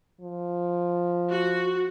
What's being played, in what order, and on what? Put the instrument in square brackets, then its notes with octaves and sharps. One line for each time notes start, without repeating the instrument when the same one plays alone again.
[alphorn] F3
[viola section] F#4